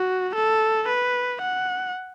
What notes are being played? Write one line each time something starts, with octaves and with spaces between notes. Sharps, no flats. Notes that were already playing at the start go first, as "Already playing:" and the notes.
Already playing: F#4
A4
B4
F#5